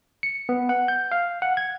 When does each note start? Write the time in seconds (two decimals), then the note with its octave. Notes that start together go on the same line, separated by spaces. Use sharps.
0.23 C#7
0.49 B3
0.69 F#5
0.88 G6
1.12 F5
1.42 F#5
1.57 G#6